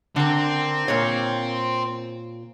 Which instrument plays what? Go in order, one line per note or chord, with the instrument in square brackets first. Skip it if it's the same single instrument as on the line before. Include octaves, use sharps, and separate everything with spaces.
[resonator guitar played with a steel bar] D3 A#4 [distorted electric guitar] C4
[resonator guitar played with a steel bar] A#2 A#4 C#5